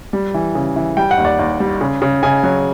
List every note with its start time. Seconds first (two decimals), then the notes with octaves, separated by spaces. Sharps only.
0.13 G3
0.34 E3
0.55 C#3
0.76 E3
0.97 G3 G5
1.11 F#5
1.18 D#2
1.25 D5
1.39 D#2
1.60 G3
1.81 C#3
2.02 C#3
2.23 C#3 G#5
2.43 F#3